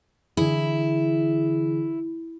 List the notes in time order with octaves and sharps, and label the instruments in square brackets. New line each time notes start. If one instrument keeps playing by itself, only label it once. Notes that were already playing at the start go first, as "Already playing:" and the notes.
[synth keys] D3 E3 G#4 [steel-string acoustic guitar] E4